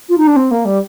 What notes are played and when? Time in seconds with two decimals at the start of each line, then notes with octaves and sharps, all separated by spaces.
0.09 F4
0.18 D#4
0.27 D4
0.36 C4
0.51 A#3
0.65 G3